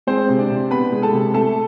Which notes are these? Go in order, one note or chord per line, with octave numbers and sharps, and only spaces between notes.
G#3 C4 C5
C3
D4 D5
C3
B3 B4 B5
G#3
A4 A5
C3
A3 A4 A5